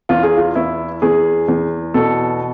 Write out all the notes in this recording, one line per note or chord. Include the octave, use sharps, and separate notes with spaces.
E2 F4
G#4
F4
E2 E4
E2 G#4
E2
B2 A4